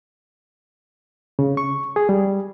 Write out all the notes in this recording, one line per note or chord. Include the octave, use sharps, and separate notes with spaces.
C#3
C#6
G#4
G3